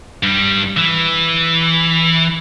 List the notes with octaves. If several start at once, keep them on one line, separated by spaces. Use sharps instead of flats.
G2 G3
E3